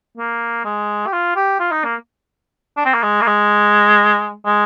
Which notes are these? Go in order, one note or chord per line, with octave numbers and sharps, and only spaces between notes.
A#3
G#3
G4
F4
G4
F4
D#4
A#3
D4
C4
A#3
G#3
A#3
G#3
G#3